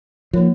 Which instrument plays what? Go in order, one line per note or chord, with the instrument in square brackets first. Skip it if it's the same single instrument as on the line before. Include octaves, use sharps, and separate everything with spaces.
[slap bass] F3 [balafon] A#3 D#4 A#4 C#5